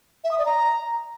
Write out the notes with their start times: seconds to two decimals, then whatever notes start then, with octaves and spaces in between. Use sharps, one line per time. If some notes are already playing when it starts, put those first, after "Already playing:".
0.24 E5
0.31 D#6
0.38 D5
0.45 A#5